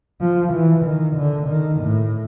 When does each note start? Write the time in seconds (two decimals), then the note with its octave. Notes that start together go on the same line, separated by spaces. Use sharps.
0.21 F3
0.53 E3
0.84 D#3
1.16 D3
1.48 D#3
1.80 A2